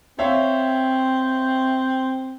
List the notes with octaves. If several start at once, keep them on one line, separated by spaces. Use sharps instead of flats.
C4 C#5 E5 F5